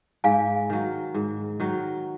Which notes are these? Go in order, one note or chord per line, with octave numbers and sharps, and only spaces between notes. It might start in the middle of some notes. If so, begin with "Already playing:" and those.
G#2 F5 G#5
D#3 F#3
G#2
D#3 F#3